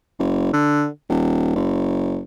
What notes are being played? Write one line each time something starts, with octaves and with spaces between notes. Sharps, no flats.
F#1
D3
D#1
F#1